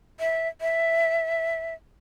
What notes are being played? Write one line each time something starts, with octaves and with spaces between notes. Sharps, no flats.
E5
E5